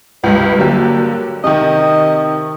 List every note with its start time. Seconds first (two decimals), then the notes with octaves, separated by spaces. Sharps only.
0.24 C#2 G2 B4
0.58 D3 F#3 A#3 G4
1.44 C3 D#3 D#5